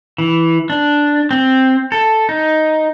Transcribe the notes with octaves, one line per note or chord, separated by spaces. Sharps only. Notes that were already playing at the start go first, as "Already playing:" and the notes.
E3
D4
C4
A4
D#4